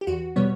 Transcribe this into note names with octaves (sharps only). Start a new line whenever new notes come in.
G4
E2 F#4
B2 G3 B3 C#5